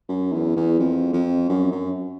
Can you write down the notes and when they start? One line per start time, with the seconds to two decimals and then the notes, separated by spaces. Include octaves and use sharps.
0.09 F#2
0.32 E2
0.56 E2
0.79 F2
1.13 F2
1.49 F#2
1.72 F#2